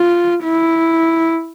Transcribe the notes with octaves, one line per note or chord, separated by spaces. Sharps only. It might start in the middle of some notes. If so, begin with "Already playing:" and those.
Already playing: F4
E4